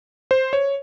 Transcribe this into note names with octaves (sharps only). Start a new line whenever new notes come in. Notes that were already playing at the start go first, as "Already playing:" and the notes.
C5
C#5